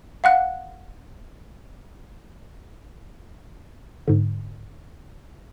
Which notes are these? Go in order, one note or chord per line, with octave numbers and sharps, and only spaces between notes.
F5 F#5 F#6
G#2 D3